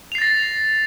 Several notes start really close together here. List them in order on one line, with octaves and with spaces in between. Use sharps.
F7 C7 A6 A#6